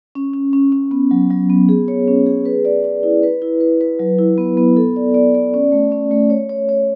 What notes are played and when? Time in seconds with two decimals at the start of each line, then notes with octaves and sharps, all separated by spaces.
0.15 C#4
0.34 C#4
0.53 C#4
0.72 C#4
0.91 B3
1.11 F#3
1.30 F#3
1.50 B3
1.69 G#4
1.88 C#5
2.08 C#4
2.26 G#4
2.45 B4
2.65 D5
2.84 D5
3.03 E4
3.23 B4
3.42 E4
3.60 B4
3.81 B4
4.00 F#3
4.19 E4
4.38 B3
4.57 B3
4.77 A4
4.96 D5
5.14 D5
5.35 D5
5.54 C#4
5.72 A3
5.92 C#4
6.11 A3
6.30 C#5
6.49 C#5
6.69 C#5